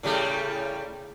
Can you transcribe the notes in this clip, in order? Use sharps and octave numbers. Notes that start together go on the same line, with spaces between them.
A2 C#3 G3